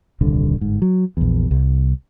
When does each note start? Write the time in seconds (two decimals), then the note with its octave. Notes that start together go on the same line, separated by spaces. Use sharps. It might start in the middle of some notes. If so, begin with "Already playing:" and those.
0.21 D#1 C2 D3
0.61 G1 G#2
0.82 F#3
1.17 A#1 E2
1.51 C2